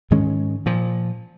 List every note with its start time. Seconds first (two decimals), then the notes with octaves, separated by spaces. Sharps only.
0.11 G#2 D#3 G#3 C#4
0.66 A#2 F3